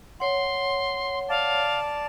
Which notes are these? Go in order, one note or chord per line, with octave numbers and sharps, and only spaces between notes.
C#5 F#5 C6
D5 F5 A5